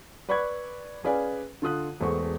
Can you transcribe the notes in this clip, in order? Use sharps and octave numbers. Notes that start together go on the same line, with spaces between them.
B4 D5 B5 C#6 F#6 G#6
C#4 G#4 B4 D5 F5 G#5
D3 F4 D#6 F#6
E1 E2 A3 C5 C#6